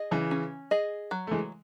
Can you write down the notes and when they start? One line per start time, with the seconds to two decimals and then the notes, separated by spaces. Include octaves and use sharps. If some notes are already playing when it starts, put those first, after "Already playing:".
Already playing: G#4 D#5
0.11 C#3 E3
0.31 C#4
0.71 G#4 D#5
1.11 F#3
1.27 A3
1.31 E3 G#3